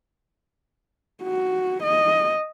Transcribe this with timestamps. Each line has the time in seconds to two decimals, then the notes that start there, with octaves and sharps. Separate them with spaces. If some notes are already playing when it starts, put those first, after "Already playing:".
1.23 F#4
1.83 D#5